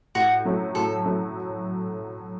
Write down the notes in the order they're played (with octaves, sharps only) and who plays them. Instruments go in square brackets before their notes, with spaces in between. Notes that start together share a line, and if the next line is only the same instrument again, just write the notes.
[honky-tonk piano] A2 [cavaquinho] F#4
[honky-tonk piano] F#3 A3 C#4
[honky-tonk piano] A2 [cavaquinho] A4
[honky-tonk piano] F#3 A3 C#4